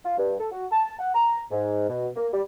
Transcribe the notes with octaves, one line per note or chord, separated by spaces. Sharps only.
F4
G2
A4
F#4
A5
F#5
A#5
G#2
B2
A#3
G3